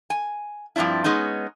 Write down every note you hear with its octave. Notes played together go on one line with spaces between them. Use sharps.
G#5
G2 F3 C4 D4 E4
G#3 B3 C#4 D#4